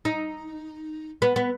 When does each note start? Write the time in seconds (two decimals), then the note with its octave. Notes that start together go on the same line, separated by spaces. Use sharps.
0.05 D#4
1.22 B3
1.36 B3